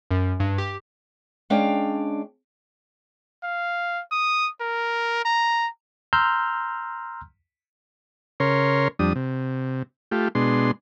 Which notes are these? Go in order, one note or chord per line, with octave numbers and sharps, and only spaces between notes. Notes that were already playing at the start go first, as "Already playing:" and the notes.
F#2
G2
G4
G#3 C#4 D4 F5 G5
F5
D#6
A#4
A#5
A#5 C6 E6 F6 G6
C#3 A#4 C#5 C6
F2 G3 D4 D#6
C3
A3 F4 G4
B2 G#3 D4 C6